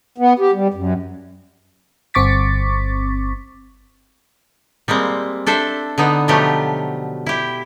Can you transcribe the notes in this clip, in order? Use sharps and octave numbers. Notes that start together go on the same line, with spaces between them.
B3
G4
G3
F#2
G1 C4 C#6 D6 A6 B6
G3 G#3 A#3 C4
D4 A4 C5 E5
D3 B3 D#4
B2 F3 F#3 A3 G4
E4 G4